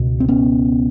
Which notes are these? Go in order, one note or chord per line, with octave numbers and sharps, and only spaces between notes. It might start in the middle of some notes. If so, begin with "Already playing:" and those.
Already playing: C#2 B2
C4
B3 C#4